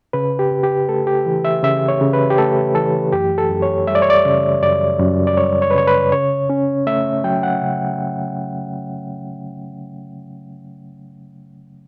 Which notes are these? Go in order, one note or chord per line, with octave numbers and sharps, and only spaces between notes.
C#3 B4
G4
C#3
G4
A3 A4
G4
E3
E5
C#3 E5
C#5
C#3
B4
G4
A3 A4
E3 A4
F#2 G4
A4
F#2
C#5
G3 E5
D5
C#5
D5
C#3
F#2 D5
F#2
D5
G3 C#5
C#5
B4
C#3 C#5
B4
C#3 C#5
C#4
A3 E5
F#3 G5
F#5
C#3